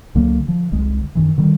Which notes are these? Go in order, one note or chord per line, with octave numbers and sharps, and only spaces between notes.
C#2 D3 F#3 A#3
D3 F3
F1 C2 D3 G#3
F#2 D#3 E3
D3 D#3 G3